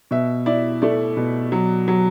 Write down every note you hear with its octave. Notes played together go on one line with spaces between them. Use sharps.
B2 E5
E4 D5
A3 D5
B2
F#3
F#3